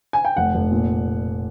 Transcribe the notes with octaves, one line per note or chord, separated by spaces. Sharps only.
G#5
G5
F1 F#5
F1
A#2